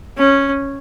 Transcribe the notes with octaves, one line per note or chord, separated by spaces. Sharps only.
C#4